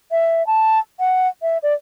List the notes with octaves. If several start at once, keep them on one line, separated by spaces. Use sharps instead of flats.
E5
A5
F#5
E5
D5